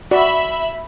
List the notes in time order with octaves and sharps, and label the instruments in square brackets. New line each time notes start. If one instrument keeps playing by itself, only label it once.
[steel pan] F#4 D5 [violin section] E5 B5